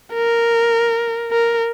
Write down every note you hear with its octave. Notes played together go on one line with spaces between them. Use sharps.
A#4
A#4